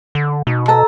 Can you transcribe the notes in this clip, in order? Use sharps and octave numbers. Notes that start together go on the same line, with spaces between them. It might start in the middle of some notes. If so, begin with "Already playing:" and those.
D3
B2 D#4
A4 B4 D#5 A5 A#5 E6